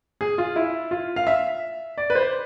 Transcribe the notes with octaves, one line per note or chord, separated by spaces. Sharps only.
G#4
F4
E4
F4
F5
E5
D5
B4
C5